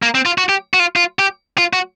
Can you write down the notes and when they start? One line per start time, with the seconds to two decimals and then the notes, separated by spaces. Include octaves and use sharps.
0.02 A#3
0.15 C4
0.26 F4
0.38 F#4
0.49 G4
0.74 F#4
0.80 F4
0.96 F4
1.19 G4
1.58 F4
1.73 F#4